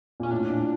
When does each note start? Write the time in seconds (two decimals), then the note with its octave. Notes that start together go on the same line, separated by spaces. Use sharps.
0.20 A#2 C#4
0.31 A2 D4
0.50 A#2